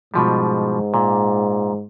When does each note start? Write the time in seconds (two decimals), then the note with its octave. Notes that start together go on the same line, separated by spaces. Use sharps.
0.14 G#2 B2 F3 G3
0.94 A#2